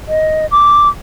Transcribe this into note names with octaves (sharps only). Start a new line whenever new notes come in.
D#5
D6